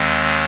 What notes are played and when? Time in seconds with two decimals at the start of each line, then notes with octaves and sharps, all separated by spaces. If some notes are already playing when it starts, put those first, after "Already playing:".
Already playing: D#2 D#3 G#3 C4